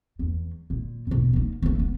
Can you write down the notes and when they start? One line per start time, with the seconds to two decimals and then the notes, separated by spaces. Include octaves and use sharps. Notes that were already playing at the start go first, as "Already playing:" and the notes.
0.19 E2
0.70 A#2
1.07 E1 A#1
1.33 A#3 D#4
1.62 A3 A#3
1.79 B3